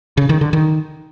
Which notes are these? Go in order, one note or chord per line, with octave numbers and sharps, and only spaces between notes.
C#3
D#3
D3
D#3